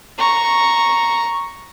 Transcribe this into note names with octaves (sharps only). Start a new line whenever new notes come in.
A#5 C#6